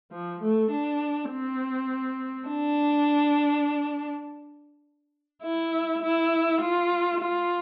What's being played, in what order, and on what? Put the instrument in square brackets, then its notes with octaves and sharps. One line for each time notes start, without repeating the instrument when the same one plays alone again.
[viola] F3
A3
D4
C4
D4
E4
E4
F4
F4